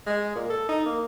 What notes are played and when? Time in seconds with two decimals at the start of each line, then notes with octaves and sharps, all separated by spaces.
0.06 G#3
0.35 A#2
0.50 A4
0.69 D#4
0.86 A#3